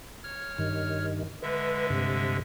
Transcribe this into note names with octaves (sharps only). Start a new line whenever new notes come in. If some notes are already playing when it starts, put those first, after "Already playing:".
C#5 F6
G2 D#3
D3 G#3 B4 E5
G2 C3